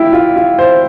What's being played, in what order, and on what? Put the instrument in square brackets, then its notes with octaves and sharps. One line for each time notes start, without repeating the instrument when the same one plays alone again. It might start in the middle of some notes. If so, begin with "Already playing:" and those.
Already playing: [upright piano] E4 G4
F4
F4
C5